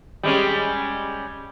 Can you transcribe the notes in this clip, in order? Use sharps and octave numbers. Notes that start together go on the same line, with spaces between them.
G3 G#3 C#4